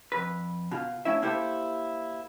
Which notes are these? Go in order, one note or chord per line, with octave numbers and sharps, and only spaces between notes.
F2 B4
B2 F4
A3 C#4 E4 E5
A#3 E4 G4 A4 C5